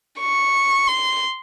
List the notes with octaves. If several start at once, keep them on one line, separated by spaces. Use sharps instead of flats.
C#6
C6